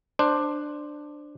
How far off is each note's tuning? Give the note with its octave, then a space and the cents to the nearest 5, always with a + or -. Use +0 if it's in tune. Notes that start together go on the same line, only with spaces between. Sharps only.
D4 +10 C5 +0